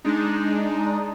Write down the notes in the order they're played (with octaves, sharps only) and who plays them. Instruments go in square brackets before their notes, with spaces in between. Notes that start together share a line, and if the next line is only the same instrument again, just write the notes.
[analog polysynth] G#3 D4 D#4